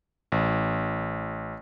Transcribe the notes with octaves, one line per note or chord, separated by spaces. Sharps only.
A1